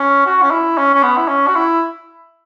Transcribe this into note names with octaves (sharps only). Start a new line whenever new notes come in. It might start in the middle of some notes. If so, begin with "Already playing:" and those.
Already playing: C#4
F#4
C#4
E4
C#4
C#4
B3
E4
C#4
F#4
E4